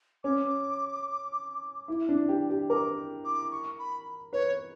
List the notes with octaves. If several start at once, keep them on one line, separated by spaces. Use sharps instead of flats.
C#4 D6
E4
D4
G4
G4
A#4 D6
D6
C#6
B5
B4 C#5